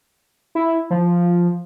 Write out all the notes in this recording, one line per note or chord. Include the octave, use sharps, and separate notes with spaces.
E4
F3